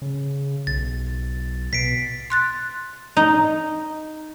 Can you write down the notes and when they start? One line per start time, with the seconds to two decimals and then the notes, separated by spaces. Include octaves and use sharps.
0.02 C#3
0.67 B1 A6
1.73 B2 B6 C7 D7
2.30 C6 F#6 A6
3.17 D#4